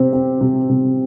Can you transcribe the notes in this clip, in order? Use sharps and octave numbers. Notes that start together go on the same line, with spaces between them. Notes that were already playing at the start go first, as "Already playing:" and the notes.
Already playing: C3 C4
C4
C3
C3